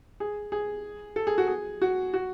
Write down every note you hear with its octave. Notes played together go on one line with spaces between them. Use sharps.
G#4
G#4
A4
G#4
F#4
G#4
F#4
F#4